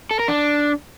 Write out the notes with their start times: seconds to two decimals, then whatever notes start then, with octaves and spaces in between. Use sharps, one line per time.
0.11 A4
0.19 A#4
0.28 D4